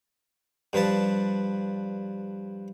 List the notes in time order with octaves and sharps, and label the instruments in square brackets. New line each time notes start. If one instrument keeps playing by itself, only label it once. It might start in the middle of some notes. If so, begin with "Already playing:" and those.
[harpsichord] G2 F3 B4 A5